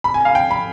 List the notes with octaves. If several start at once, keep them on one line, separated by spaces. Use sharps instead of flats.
B5
G#5
F5
G5
B5